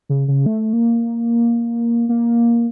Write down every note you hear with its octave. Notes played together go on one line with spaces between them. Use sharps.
C#3
C#3
A3
A#3
A#3